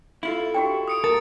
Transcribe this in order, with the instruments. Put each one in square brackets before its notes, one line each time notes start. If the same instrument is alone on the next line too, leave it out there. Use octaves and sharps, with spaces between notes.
[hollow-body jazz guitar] E4 F4 A4
[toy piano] F#4 G4 G5
[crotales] D#6 C#7 D7
[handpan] A#4 [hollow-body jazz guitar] A5 [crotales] A6 D7